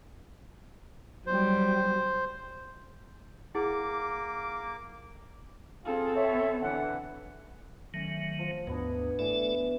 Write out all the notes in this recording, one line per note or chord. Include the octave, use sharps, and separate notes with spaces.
F#3 G3 C5
A#3 E4 G#4 F#5 D6
C4 F4 G#4 A4
C#5 E5
D3 E3 F#5
D#3 F#3 A3 C#4
F3
D#2 G#2 B2 B3 D4
E3 A3 A4 D5 G#5